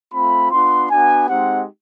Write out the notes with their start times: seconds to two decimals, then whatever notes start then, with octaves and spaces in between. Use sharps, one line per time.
0.13 A3 C4 F4 B5
0.51 B3 D4 F4 C6
0.89 B3 D4 F#4 G#5
1.29 G#3 C4 D#4 G4 F#5